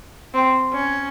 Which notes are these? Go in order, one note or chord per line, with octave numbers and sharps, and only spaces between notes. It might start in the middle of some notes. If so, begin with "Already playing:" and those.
C4
C#4